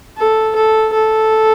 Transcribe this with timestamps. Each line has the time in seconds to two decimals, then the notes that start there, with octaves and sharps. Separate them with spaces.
0.18 A4
0.56 A4
0.93 A4